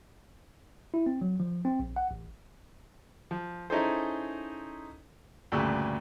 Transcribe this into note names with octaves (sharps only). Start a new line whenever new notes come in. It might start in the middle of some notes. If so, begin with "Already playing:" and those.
E4
C4
F#3
F3
C4
A#1
F#5
A1
F3
C#4 D#4 E4 G#4 A4 C5
D2 G2 A#2 C#3 E6